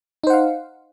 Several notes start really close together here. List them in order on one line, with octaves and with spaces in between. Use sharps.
D#4 C5 F#5 F5